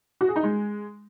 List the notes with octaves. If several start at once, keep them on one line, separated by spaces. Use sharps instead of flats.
F#4
G#4
D#4
G#3